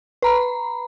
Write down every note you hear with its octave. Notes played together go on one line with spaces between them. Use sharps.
B4 A#5 B5